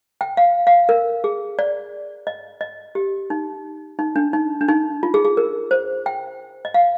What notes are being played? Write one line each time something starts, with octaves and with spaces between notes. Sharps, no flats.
G5
F5
F5
A#4
G#4
D5
D#5
D#5
G4
D#4
D#4
D4
D#4
D4
D#4
F4
G#4
G#4
A#4
C5
G5
D#5
F5